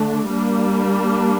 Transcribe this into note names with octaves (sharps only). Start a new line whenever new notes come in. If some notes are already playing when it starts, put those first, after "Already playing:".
Already playing: D3 A3 D4
G3 A#3 D4